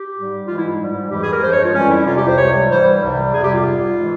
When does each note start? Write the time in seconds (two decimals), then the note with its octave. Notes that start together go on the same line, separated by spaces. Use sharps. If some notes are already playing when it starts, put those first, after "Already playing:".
Already playing: G4
0.16 G#2 G3
0.48 G#2 E3 G#3 F4
0.58 E4
0.80 G#2 G3
1.11 F2 E3 G#3 G4
1.22 G#4
1.33 A#4
1.43 G2 F3 G#3 C5
1.53 C#5
1.64 F4
1.74 F2 E3 G3 C#4
1.90 E4
2.06 F2 C3 G3 F4
2.17 G4
2.27 C5
2.38 C#2 C3 G3 C#5
2.70 G#2 E3 G3 C5
3.01 C2 C3 G3
3.34 F2 C3 G3 G#4
3.44 G4
3.54 F4
3.65 G#2 G3
3.97 E3 G#3